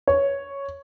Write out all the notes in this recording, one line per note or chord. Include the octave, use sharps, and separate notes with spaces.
C#5